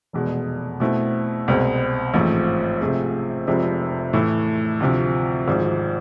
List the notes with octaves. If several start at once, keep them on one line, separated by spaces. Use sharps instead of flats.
F1 E2 B2 G#3
B2 A3 C4 E4
C2 B2 G#3 C4
A1 G#2 F3 A3 C4
C3 F3 A3 C4 G#4
F1 F2 C3 G#3 C4
A2 E3 A3
D2 C3 F3
G#1 G#2 F3